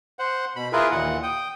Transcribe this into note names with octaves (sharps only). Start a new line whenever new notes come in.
C5 F#5
B2 B5
E4 F4 G#4 A#4 B4
D#2 A#2 E3 F#5
G5 D#6